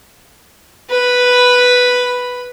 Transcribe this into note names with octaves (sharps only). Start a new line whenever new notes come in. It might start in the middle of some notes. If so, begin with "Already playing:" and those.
B4 B5